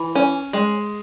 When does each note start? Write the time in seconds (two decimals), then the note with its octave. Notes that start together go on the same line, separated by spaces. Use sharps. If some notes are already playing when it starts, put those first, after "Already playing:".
Already playing: E3
0.15 C#4
0.53 G#3